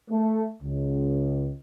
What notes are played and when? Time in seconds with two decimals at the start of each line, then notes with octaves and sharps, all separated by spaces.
0.10 A3
0.63 C#2